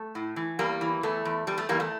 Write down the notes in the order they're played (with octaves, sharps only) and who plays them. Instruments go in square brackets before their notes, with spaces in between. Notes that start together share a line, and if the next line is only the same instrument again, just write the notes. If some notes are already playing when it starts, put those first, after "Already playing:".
Already playing: [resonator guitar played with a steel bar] A3
A2
E3
E2 G3 A#3
E3
E2 A3
E2
E2 G3
A3
E2 G3 A#3
A3